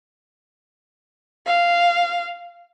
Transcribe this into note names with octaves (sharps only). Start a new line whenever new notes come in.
F5